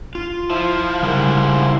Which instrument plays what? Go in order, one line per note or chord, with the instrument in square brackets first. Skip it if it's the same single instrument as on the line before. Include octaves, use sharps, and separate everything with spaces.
[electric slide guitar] F4
[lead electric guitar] F3 [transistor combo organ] E4 C5
[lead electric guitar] G#2 F3 [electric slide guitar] C#3 G3 A#4